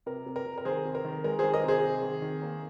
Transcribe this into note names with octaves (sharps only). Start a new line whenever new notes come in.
C3 A#4
C3
A#4
C3
A#4
D#3 G#4 C5
C3
A#4
D#3
G#3 A#4
D#3 G#4 C5
A#4 D#5
C3 G#4 C5
C3
D#3
D#3
A#3